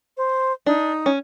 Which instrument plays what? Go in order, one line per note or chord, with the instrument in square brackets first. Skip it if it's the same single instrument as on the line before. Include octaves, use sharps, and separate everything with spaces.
[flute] C5
[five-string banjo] D4 [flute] D#4
[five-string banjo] C#4